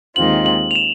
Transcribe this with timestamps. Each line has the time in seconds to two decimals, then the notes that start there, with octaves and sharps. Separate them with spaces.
0.16 D#2 D#3 G#3 C4 F4 F#7
0.46 F#7
0.71 F7
0.75 E7